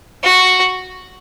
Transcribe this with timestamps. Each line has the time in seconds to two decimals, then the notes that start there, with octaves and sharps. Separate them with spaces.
0.23 F#4